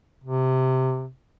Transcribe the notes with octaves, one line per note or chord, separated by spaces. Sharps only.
C3